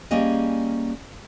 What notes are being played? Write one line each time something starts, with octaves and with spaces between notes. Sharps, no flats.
G3 A#3 C#4 G#4 D#5